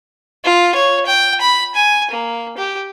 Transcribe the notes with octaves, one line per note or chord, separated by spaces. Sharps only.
F4
C#5
G5
B5
G#5
A#3
G4